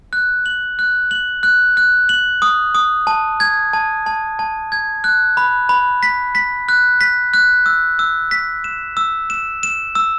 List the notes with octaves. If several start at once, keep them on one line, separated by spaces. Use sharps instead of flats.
F#6
F#7
F#6
F#7
F#6
F#6
F#7
D#6
D#6
A5
G#6
A5
A5
A5
G#6
F#6
B5
B5
B6
B6
F#6
B6
F#6
E6
E6
B6
E7
E6
E7
E7
E6